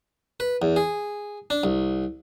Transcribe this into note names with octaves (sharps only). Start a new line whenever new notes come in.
B4
E2
G#4
D4
C2